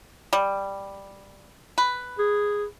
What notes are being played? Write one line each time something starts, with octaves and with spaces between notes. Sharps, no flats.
G3
B4
G#4